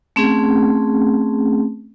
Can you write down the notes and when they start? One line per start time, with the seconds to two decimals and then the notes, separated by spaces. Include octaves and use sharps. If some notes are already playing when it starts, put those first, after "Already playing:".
0.16 A3 C4 C#4 G#4